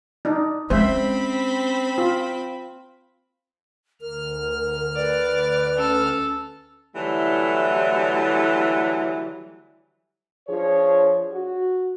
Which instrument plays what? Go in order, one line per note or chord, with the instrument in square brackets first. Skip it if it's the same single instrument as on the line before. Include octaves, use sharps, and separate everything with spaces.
[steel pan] D4 D#4
[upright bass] G#3 C#4 [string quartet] C4 B5 [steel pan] C5 E5
[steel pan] F4
[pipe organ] D2 F6 [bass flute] A#4
[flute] B4 [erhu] D5
[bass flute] C#4 [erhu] A4
[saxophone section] D3 E3 F#3 G3 A3 E4
[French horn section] F3 D4 G#4 C#5
F#4